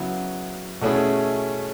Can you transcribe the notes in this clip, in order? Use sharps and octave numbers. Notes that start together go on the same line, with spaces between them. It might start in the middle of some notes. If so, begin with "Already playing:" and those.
Already playing: C#3 F#3 B3 E4
B2 A3 C#4 E4 G#4